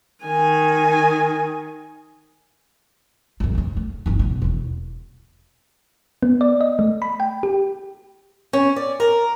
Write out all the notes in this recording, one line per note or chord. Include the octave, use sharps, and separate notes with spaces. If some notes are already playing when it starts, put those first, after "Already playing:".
D#3 G#5
A#1 F#2
F1 F2
A3
G1 D#4
F#1 B2
E1 D#2
B3
D5
D#5
A3
B5
G5
G4
C#4
D5
A#4